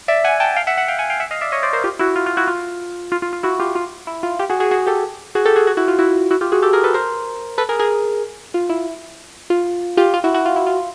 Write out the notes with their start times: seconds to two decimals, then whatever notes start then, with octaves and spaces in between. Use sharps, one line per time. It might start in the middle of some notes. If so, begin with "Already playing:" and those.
0.08 D5 E5
0.24 F#5 G#5
0.40 G5 A5
0.56 F5 G5
0.67 E5 F#5
0.78 E5 F#5
0.88 F5 G5
0.98 F#5 G#5
1.10 F5 G5
1.20 E5 F#5
1.31 D#5 F5
1.41 D5 E5
1.52 C#5 D#5
1.63 C5 D5
1.73 A#4 C5
1.84 F4 G4
1.99 E4 F#4
2.16 F4
2.26 F4
2.37 E4 F#4
2.47 F4
3.12 F4
3.22 F4
3.33 F4
3.43 E4 F#4
3.59 F4 G4
3.75 F4
4.07 E4
4.23 F4
4.39 F4 G4
4.49 F#4 G#4
4.60 F#4 G#4
4.71 F#4 G#4
4.87 G4 A4
5.35 F#4 G#4
5.45 G4 A4
5.56 F#4 G#4
5.67 F#4 G#4
5.77 E4 F#4
5.88 F4
5.99 E4 F#4
6.31 E4 F#4
6.41 F4 G4
6.52 F#4 G#4
6.62 G4 A4
6.73 G#4 A#4
6.84 A4 B4
6.94 A#4 C5
7.58 A4 B4
7.69 G#4 A#4
7.79 G#4 A#4
8.54 F4
8.69 E4
9.50 F4
9.97 F4 G4
10.14 F4
10.24 E4 F#4
10.34 E4 F#4
10.46 F4
10.56 E4
10.67 F4